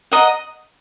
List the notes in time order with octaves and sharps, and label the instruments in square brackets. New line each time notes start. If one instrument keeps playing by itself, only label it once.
[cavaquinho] D#5 F#5 A#5